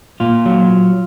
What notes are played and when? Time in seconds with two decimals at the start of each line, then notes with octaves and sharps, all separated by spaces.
0.20 A#2 F4
0.46 F#3